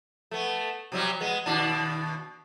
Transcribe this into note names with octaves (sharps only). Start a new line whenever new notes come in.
A3 B3
C3 F#3 G3
G#3 B3
D#2 B2 D4